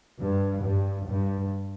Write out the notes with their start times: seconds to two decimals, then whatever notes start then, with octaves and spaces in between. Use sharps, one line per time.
0.20 G2
0.64 G2
1.07 G2